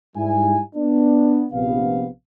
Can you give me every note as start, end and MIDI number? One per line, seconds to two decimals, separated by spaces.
0.17 0.59 44
0.17 0.59 55
0.17 0.59 64
0.17 0.59 80
0.75 1.45 59
0.75 1.45 62
1.52 2.07 34
1.52 2.07 48
1.52 2.07 59
1.52 2.07 77